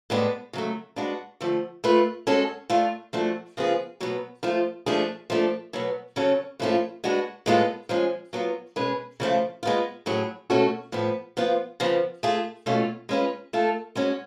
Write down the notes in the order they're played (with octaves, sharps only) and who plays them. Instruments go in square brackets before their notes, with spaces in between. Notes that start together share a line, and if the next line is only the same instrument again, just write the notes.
[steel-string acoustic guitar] A2 G#3 B3 D4
C#3 F#3 A3
G#3 D4 F#4 B4
D3 F3 A3
A3 F4 B4
G#3 C#4 F#4 A4
A3 D4 F4
F3 A3 D4 F#4
C#3 F3 B3 F4 G#4
B2 F#3 B3
F3 A3 F4
F3 A3 D4 G#4
F3 A3 D4
B2 F#3 B3
C#3 F#3 C#4 F#4 A4
A2 F3 A3 C#4 F4
G#3 D4 F#4 B4
A2 G#3 B3 F4 A4
F3 G#3 C#4 G#4
F#3 B3 F4
B2 G#3 C#4 G#4 B4
C#3 F3 A3 F4
G#3 B3 F4
A2 F#3 C#4 G#4
B2 A3 C#4 F#4 A4
A2 F3 B3
F3 B3 F4
C#3 F3 B3
A3 F4 G#4
B2 A3 C#4 F4
G#3 C#4 F4 B4
A3 F4 A4
G#3 C#4 F#4